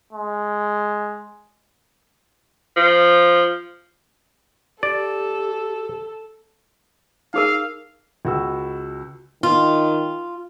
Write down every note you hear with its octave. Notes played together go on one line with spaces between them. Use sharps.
G#3
F3
G4 A4 D5
D#4 G#4 A#4 F5
C#2 F#4 E6
D#3 F4